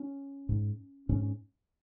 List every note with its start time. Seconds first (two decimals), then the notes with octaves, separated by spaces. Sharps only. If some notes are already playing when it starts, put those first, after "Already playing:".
Already playing: C#4
0.49 G#2
1.09 G#2 C#4
1.20 C#4